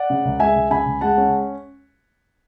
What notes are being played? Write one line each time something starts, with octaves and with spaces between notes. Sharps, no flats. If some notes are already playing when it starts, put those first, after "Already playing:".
Already playing: D5 F#5
C#3
C#2
G#3 E5 G#5
C#2
C#3 G#5 B5
C#2
G#3 F#5 A5
C#4